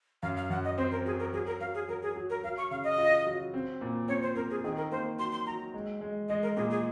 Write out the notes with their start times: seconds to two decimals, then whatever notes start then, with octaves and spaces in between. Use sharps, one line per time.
0.23 F#2 F5
0.37 F5
0.50 F#2 F#5
0.65 D#5
0.78 C4 C5
0.91 A#4
1.05 F#3 G#4
1.19 A#4
1.33 F#3 G#4
1.46 A#4
1.60 F#3 F5
1.75 G#4
1.89 F#3 A#4
2.02 G#4
2.16 F#3
2.30 A#4
2.44 F#3 F5
2.57 C#6
2.71 C#3 F5
2.84 D#5
2.98 F4
3.26 F#3
3.54 C4
3.81 A#2
4.08 C4 C#5
4.22 C5
4.36 C4 A#4
4.51 G#4
4.64 D#3 G#4
4.77 A#4
4.91 A#3 C5
5.19 F#3 C6
5.32 C6
5.47 F#3 A#5
5.74 G#3
6.01 G#3
6.28 G#3 D#5
6.42 A#4
6.56 A#2 G#4
6.70 G#4